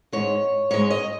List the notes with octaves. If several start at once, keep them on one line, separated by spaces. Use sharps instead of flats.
G#2 G#3 C#5
G#2 G#3 C#5
D#5